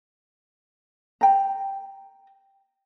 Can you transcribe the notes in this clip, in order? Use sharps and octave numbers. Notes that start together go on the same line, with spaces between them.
G5 A#5